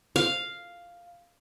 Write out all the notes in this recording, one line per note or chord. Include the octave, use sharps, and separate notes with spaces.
F5